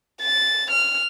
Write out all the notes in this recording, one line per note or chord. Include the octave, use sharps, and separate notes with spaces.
A6
F6